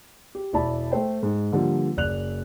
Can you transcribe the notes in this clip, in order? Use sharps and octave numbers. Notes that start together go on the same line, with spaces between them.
G4
E1 E4 D5 A5 B5
A3 A4 C5 G5
G#2
D3 F3 G3 A#3
F#1 D5 F#6 F7